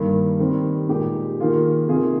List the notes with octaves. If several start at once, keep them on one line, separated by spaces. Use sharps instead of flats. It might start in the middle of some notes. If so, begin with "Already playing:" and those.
Already playing: G2 D#3 A#3
D#3 G3 C4
A#2 G#3 D#4 G4
D#3 A#3 F4 G#4
C3 D#3 A#3 F4 G#4